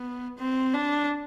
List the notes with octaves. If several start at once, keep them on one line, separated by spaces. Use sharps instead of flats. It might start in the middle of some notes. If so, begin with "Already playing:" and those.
Already playing: B3
C4
D4